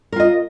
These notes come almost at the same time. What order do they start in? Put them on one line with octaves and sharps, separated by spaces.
A#4 F4 D#5